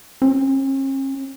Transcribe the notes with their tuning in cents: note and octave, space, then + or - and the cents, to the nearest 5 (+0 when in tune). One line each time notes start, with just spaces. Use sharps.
C#4 -45